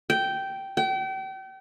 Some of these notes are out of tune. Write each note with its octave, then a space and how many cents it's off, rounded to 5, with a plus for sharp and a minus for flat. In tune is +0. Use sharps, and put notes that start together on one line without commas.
G5 -10
G5 -35